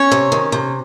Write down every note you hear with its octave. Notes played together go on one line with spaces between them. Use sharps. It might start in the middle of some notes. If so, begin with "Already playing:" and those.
Already playing: C#4 C#5
C3
D#3
C3